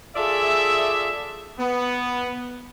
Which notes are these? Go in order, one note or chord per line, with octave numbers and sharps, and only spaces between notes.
F4 G#4 A4 D5 E5
B3